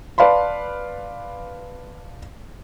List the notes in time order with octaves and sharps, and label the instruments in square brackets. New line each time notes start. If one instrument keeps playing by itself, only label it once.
[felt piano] B4 D5 F5 A5 B5 C6